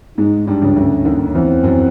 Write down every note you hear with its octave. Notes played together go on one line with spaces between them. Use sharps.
G#2 G#3 D#4
G2 G3 D4
C#2 C#3
D2 D3 C#4
D#2 D#3
E2 E3 C4
F#2 F#3